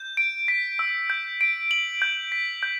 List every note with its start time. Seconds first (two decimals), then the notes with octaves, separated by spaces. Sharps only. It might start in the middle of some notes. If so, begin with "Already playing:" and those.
Already playing: G6
0.17 D7
0.48 B6
0.79 E6
1.10 G6
1.41 D7
1.71 F#7
2.02 G6
2.32 B6
2.63 G6